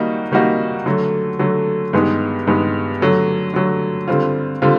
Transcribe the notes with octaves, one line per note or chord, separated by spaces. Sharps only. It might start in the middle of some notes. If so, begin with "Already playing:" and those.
Already playing: D#3 G3 A#3 D#4 F#4
D#3 G3 A#3 D#4 F#4
D3 F#3 A3
D3 F#3 A3
G2 D#3 G#3 B3
G2 D#3 G#3 B3
D3 F#3 A3
D3 F#3 A3
D3 G3 C4 F4
D3 G3 C4 F4